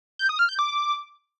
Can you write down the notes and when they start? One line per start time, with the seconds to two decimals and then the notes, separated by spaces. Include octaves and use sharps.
0.19 G6
0.29 D#6
0.39 F6
0.49 G6
0.59 D6